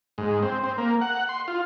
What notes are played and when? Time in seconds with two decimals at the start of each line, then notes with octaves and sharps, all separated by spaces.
0.18 G#2
0.42 C4
0.64 C4
0.78 A#3
1.01 F#5
1.29 C6
1.48 F4